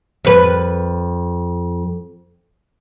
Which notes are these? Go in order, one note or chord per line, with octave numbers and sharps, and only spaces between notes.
F2 B4